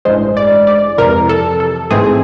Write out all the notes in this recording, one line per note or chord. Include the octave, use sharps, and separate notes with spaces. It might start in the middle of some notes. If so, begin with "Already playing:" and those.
A1 G2 E3 G#3 C5
D5
D5
F2 C3 E3 A#4
A4
A4
A1 G#2 E3 A3 C4 G#4